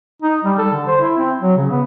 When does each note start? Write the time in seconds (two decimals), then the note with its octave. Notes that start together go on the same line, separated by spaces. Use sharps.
0.22 D#4
0.44 G3
0.59 A4
0.73 D3
0.87 C5
1.01 E4
1.18 C4
1.40 F#3
1.57 C#3
1.71 B3